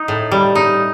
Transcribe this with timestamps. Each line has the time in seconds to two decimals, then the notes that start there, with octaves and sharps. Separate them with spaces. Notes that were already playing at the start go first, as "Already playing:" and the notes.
Already playing: D#4
0.08 A2
0.31 G3
0.55 D#4